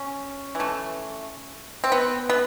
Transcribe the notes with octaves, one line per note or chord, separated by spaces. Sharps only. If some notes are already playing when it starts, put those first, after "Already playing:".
Already playing: C#4
E3 A3
C4
B3
B3